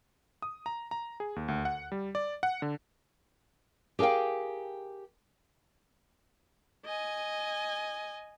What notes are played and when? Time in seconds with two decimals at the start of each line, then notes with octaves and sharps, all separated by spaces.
0.42 D#6
0.66 A#5
0.91 A#5
1.20 G#4
1.36 D#2
1.48 D2
1.65 F#5
1.92 G3
2.15 D5
2.43 F#5
2.62 D3
3.99 G4 G#4 A#4 F5 G5
6.85 D#5 G#5